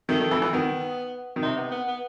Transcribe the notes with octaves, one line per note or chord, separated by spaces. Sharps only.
D#3 A3
D#3
E3
E3
D#3 B3
D#3
C3 D#4
B3
B3
B3